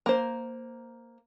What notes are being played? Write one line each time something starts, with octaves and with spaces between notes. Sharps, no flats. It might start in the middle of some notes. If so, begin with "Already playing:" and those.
A#3 C5